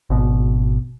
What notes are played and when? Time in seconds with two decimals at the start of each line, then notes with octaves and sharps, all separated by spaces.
0.10 G#1 B2